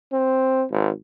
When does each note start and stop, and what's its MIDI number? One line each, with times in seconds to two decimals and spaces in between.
0.13 0.65 60
0.70 0.90 32